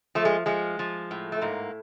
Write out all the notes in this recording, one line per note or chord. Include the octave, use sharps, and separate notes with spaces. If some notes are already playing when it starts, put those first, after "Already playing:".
F3 A3
G#3
F3 G#3
F3
A2
A3
G#2 A#3